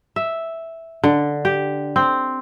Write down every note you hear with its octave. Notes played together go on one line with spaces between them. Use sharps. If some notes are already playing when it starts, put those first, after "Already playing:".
E5
D3
G4
C4